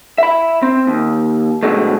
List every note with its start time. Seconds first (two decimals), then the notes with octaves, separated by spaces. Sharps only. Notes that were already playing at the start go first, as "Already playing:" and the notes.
0.18 E5 B5
0.63 C4
0.87 D#2
1.63 B2 D3 F#3 G#3 A3